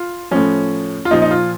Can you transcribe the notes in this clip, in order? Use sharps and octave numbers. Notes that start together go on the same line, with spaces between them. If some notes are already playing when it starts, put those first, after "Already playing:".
Already playing: F4
A2 F3 C#4
F4
A#2 F3 D#4
D#4
F4